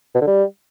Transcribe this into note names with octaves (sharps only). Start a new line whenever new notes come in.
B2
D3
G3